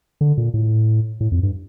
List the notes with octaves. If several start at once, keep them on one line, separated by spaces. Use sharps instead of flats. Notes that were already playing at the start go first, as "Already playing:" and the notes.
D3
A#2
A2
A2
F2
G2